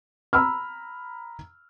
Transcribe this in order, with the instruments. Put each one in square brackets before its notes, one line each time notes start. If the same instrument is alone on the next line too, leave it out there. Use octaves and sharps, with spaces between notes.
[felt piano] A#5 B5 E6 F6